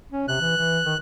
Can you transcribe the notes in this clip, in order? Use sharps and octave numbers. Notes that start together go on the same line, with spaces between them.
C#4
C3 F#6
E3
E3
D#3